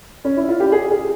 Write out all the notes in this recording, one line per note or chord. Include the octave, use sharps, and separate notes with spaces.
C#4
E4
F4
G4
G#4
G#4